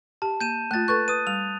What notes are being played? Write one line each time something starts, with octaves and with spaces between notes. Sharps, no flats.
G4 A5
A#3 G6 D#7 E7
A3 F4 F#6 A6
A4 B4 C#6 F#6 A6
B4 D#6 D#7
G3 F7